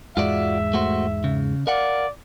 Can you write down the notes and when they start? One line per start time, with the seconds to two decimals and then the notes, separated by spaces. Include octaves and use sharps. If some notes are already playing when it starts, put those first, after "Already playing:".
0.17 E2 G#2 G#3 F4 F#4 D5 E5
0.73 A3 F#4 C5
1.24 C#3
1.67 A#4 D5 F5 F#5